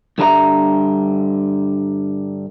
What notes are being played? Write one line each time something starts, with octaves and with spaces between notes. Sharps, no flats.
G2 D3 G3 A#4 E5 A#5